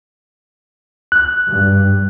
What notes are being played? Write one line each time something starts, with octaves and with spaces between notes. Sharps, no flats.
F#6
G2